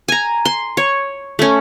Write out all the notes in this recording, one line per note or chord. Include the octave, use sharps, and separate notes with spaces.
G#5 A#5
C6
C#5
A3 C#4